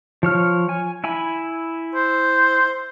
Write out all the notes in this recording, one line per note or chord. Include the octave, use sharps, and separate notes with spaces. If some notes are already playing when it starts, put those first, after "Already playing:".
F3 C#5 F6
G#5
E4 G#5 B5
C5